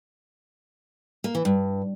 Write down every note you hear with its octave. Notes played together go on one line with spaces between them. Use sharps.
A#3
E3
G2